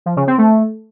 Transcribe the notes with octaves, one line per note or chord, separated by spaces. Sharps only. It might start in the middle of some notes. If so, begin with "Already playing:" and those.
F3
C#3
C4
A3